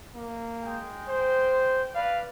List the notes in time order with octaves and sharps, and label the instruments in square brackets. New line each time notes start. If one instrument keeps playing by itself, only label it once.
[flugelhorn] A#3
[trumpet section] G#3 G5
[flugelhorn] C5
[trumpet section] B4 D5 [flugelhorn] F5